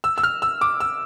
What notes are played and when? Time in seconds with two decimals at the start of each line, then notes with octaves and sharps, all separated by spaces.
0.04 E6
0.18 E6
0.23 F6
0.42 E6
0.61 D6
0.80 E6